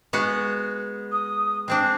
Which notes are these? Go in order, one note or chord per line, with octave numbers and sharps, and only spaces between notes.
G#3 B3 F#4
D#6
G#3 C4 D4 G5